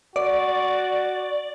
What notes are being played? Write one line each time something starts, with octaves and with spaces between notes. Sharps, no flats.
F#4 D5